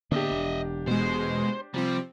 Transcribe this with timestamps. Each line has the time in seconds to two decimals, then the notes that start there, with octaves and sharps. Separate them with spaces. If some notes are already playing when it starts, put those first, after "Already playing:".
0.11 D3 A#3 B3 D4 G4 D#5 E5
0.31 E1
0.87 B2 G#3 C5
1.74 C3 F3 G3 C4